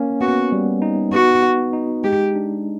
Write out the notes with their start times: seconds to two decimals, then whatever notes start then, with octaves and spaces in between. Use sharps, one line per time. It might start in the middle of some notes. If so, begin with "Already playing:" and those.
Already playing: A#3 C#4
0.21 B3 F#4
0.52 G3
0.82 D#4
1.13 B3 F#4
1.43 F#4
1.73 D#4
2.04 G#3 G4
2.35 D4